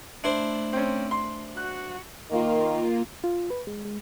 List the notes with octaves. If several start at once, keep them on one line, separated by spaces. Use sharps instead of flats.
A3 D4 E4 C5
C4 C#4
C6
F#4 F#6
D#3 A#3 F4
F4
B4
G#3
G#3